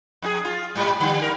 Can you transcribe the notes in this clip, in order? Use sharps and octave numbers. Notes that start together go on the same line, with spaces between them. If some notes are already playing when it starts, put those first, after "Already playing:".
F2 D#4 G#4
F4
G#2 G3
D3 G3
G2 A#4